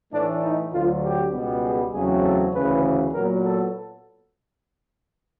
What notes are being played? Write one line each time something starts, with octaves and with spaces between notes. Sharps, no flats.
A2 E3 A3 D4
D#4
D2 D3 F#3 F4
G4
C#2 B2 G3 B3
G#4
E2 C#3 F#3 A3 C4 G#4
A4
D2 C#3 E3 B4
A#2 F#3 B3 A#4
A4